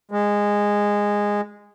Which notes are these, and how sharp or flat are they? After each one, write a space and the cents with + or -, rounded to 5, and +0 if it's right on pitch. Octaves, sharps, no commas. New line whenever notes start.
G#3 -15